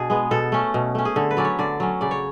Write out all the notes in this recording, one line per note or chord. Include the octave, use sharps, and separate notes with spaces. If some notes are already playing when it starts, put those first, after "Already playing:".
Already playing: B2 D4 G#4
G#3 B3
B2 A4
A3 C#4
B2
A3 C#4
G#4
D3 A4
B4
F#3 C#4 D5
C#5
D3 D5
F#3 C#4
C#3 D5
C#5